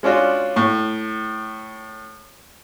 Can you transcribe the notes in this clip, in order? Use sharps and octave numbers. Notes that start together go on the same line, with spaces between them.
G#3 C#4 D4 F4 F#4
A2